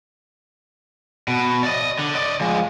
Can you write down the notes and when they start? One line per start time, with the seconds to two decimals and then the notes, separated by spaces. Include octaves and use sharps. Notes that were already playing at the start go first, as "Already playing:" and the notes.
1.28 B2
1.63 D5 D#5
1.99 D3
2.15 D5 D#5
2.41 F3 G#3